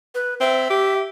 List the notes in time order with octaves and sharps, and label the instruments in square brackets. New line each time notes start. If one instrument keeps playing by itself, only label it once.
[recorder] B4
[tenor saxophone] C4 [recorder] E5
[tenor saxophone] G4